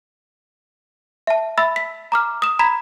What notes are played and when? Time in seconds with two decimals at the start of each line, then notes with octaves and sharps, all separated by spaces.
1.27 E5 A5
1.58 E5 B5 E6 A6
1.76 B6
2.12 A#5 D6 F6
2.42 D#6 E7
2.59 A#5 B5 G#6 B6